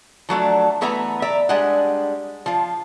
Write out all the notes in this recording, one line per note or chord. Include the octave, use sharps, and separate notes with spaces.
F3 F#3 A3 D4
E3 A3 B3 B4 E5 A#5
D5 E5 A#5
G3 G#3 D4 D#5 F#5
F3 F4